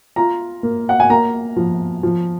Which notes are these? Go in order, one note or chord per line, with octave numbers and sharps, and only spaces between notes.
F4 A#5
A#3
F#5
G#5
A#3 A#5
F3
F3